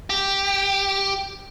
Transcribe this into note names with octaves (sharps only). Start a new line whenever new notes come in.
G4